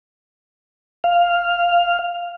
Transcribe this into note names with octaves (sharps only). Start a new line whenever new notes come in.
F5